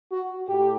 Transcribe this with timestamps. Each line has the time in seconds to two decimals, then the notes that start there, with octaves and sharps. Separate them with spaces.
0.12 F#4
0.48 A2 G4